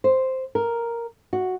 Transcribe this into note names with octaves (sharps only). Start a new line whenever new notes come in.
C5
A#4
F#4